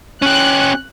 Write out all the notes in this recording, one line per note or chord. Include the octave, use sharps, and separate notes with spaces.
C#4 G4 F#6